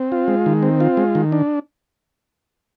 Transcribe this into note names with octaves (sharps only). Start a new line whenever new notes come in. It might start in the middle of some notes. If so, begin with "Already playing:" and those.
Already playing: C4
F4
G#3
D#3
C4
F4
G#3
D#3
D4